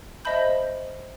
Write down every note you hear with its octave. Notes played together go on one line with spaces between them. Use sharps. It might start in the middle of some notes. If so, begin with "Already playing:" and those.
C5 D#5 E5 A5 B5 G6